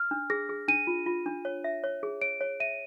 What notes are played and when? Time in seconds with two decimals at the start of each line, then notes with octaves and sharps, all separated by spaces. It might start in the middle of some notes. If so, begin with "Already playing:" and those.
Already playing: F6
0.11 D4
0.30 G#4 A#6
0.49 G#4
0.68 D4 D#7
0.87 F4
1.06 F4
1.26 D4
1.45 C#5
1.64 E5
1.84 C#5
2.03 G#4
2.22 C#5 D7
2.41 C#5
2.60 E5 D#7